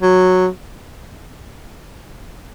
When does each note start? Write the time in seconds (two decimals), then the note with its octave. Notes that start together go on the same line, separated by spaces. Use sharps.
0.02 F#3